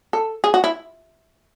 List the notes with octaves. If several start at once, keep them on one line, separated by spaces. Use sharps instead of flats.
A4
G#4
F#4
E4